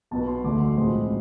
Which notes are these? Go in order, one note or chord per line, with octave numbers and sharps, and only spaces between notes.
B1 B2 B3 A5
C6
D2 D3 A3 D6
C6
B1 A2 F3 G#3 C4